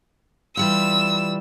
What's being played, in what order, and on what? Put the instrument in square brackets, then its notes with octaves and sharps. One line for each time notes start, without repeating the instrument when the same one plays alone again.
[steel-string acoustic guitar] E3 G3 F4 [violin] E6